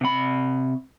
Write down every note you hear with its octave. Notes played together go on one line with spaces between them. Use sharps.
C3 B5